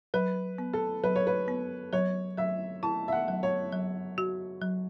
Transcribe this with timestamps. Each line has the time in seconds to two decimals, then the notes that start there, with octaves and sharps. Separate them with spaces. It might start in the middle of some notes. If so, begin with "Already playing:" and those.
0.14 F#3 B4
0.58 B3
0.73 A4
1.04 F#3 B4
1.16 C#5
1.27 B4
1.48 B3
1.92 F#3 C#5
2.38 F#3 E5
2.83 E4 A5
3.08 E5
3.12 F#5
3.28 F#3
3.43 C#5
3.72 F#3
4.18 F#4
4.62 F#3